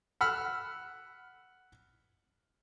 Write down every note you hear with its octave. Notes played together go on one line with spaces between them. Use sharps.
F#5 B5 E6 F6